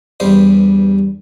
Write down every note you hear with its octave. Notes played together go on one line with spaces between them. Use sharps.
E2 G2 G3 C5